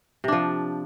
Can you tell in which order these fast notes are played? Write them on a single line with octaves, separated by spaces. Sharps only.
C3 D4 F3